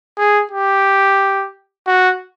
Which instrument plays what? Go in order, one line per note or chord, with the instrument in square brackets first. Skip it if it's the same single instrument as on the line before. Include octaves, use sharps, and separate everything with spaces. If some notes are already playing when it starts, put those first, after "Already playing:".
[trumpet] G#4
G4
F#4